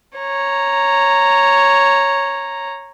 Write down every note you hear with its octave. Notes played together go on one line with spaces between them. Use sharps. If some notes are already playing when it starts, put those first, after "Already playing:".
C#5 A#5